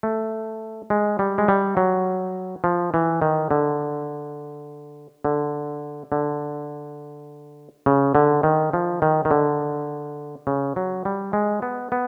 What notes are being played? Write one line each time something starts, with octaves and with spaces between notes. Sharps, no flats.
A3
G#3
G3
G#3
G3
F#3
F3
E3
D#3
D3
D3
D3
C#3
D3
D#3
F3
D#3
D#3
D3
C#3
F#3
G3
G#3
B3
B3